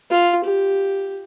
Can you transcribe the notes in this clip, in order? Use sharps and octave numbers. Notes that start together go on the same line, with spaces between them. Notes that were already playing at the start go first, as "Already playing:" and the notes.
F4
G4